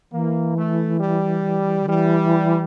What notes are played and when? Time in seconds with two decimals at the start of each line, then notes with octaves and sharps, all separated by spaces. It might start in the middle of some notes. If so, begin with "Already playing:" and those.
0.12 E3 A#3
0.56 A3
1.00 G3
1.82 D3
1.88 E3 G3